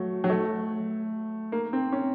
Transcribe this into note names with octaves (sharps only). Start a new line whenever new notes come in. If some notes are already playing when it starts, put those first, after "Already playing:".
Already playing: F#3 A3
F#3
A3
A#3
C4
C#4